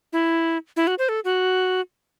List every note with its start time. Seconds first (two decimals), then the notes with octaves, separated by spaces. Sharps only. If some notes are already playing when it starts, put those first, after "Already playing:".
0.13 E4
0.76 E4
0.87 F#4
0.99 C5
1.09 A4
1.25 F#4